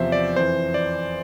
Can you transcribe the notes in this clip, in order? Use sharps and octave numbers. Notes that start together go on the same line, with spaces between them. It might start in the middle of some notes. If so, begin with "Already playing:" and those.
Already playing: E2 C3 F3 C5 E5
D5
F2 E3 C5
D5